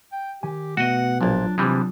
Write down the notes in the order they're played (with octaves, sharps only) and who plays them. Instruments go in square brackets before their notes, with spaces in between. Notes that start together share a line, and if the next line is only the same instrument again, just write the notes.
[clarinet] G5
[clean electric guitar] D#3 G#5 [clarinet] G4
[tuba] B2 [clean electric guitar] A3 B3 [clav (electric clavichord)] F#4 D#5 [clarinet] F#5
[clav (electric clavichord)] A#1 A#2 [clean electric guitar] F#3 F4 [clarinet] D4
[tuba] C3 [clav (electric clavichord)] E3 G3 G#3 [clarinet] D4